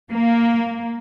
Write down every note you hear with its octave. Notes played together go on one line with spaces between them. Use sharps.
A#3